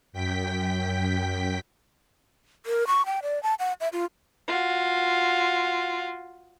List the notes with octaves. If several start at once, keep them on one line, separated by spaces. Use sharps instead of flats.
F#2 G5 B6
A#4
C#6
G5
D5
A5
F#5
E5
F4
F4 F#4